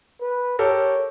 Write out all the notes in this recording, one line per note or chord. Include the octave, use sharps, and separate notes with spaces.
B4
G4 A4 A#4 C#5